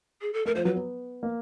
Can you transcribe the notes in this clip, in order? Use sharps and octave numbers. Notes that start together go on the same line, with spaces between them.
G#4
A4
A3 A#4
F3 C5
F#3 B4
B3
A#3